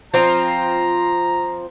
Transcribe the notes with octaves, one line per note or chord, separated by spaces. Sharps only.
F3 C4 F4 A#5